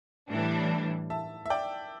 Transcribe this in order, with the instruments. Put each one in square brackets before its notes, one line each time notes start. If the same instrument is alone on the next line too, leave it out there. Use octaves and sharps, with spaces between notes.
[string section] A2 E3 G3 D4
[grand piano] E5 A5
E5
D5 G5